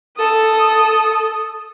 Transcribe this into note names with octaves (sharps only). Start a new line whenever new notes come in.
A4 D#6